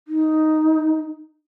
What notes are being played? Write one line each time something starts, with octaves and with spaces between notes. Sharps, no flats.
D#4